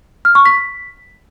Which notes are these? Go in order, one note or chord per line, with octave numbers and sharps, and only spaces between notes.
F6
C#6
B6